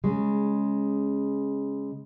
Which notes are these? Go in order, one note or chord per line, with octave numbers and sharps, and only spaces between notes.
C#3 G#3